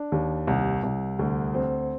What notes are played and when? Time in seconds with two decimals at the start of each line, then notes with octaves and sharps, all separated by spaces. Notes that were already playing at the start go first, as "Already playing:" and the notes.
Already playing: D4
0.12 D#2
0.47 C2
0.83 C2
1.19 D2
1.54 C4